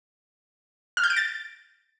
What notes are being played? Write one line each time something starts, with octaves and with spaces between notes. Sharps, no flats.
F6
G6
D7
A6